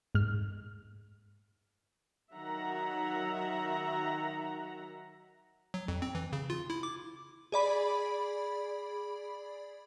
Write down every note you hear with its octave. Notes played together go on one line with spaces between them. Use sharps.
G#2 F6
D#3 F#3 E5 F#5 A#5
F#3
F2
C4
E3
C#3
F4
E4
D6
G#4 D5 B5